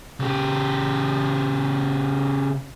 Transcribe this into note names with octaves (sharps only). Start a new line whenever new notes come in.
C#3 G4